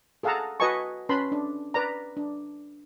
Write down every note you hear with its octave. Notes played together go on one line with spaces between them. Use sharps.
G#4 A4 F5 F#5 A5 A#5
F#4 B4 D#5 G#5 A5 C#6
C#4 B4 A5 B5 C6
D4
B4 D5 A#5
D4